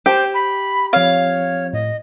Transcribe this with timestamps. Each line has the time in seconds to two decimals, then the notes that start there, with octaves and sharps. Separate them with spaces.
0.06 G4 C5
0.34 B5
0.93 F3 C4 C#5 F5
1.73 A2 D#5